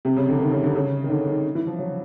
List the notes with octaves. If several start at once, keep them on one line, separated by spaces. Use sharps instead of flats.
C3
C#3
D3
D#3
C#3
D3
C#3
D#3
D3
D#3
E3
F3
F#3